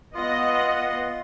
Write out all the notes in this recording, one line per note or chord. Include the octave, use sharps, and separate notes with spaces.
B3 F4 D#5 F#5